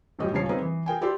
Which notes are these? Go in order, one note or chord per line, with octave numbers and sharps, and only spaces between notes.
D#1 F#2 A2 G4 D#5 D#6
D#1 C#2 C#3 C#5 A5 C7
A#3 C4 D#4 G#4 B4
E3
G#4 A#4 G5 G#5
E4 G4 A4 D5 C6